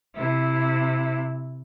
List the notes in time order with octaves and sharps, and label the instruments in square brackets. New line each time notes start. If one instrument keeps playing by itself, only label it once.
[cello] C3 E4